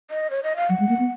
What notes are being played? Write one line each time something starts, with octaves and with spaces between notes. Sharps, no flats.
D#5
C#5
D#5
F5
F#3 F#5
G#3
A#3
B3